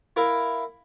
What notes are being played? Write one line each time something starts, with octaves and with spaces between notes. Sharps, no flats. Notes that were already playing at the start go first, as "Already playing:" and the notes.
E4 A#4 F5